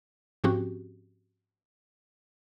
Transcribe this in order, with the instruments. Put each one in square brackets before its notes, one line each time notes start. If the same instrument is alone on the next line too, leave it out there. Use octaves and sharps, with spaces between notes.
[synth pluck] G#2 F3 C4 C#4 F#4 G4